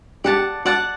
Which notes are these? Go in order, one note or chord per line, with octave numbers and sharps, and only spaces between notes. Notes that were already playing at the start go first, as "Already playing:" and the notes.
G4 D5 F#5 A5
F#4 D5 F#5 A5